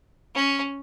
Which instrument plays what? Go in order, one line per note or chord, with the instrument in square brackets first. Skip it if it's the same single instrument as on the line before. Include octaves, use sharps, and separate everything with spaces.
[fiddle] C#4